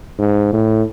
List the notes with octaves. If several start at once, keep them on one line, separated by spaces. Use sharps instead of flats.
G#2
A2